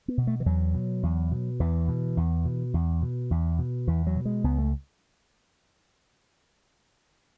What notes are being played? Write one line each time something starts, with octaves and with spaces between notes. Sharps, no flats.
B3
B2
A3
E3
E2 F#3
B2
E2
B2
E2 E3
B2
E2
B2
E2
B2
E2
B2
E2 E3
F#3
B2
G#3
C#2 B3
A3